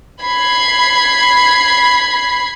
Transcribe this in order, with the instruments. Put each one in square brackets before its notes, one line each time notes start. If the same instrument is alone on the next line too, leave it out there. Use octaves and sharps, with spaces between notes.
[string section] B5 G#6 C7